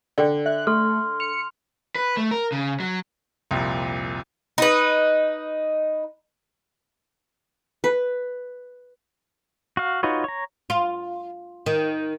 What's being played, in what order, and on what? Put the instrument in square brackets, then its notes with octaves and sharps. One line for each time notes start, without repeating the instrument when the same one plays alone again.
[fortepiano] D3 [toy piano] D5 G5
[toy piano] E5 [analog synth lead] F#6
[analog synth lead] A3 [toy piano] A4 [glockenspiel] C6 F6
[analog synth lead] C#7 [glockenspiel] F7
[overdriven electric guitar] B4
A3
A#4
C#3
F#3
[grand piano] C2 F2 A#2
[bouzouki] D#4 B4
[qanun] B4
[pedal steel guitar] F#4 F5
D#4 F4 F#4 B4 C#5
C#5 A#5
[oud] F4
D#3